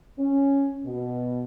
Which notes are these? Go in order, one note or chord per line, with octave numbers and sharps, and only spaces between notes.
C#4
B2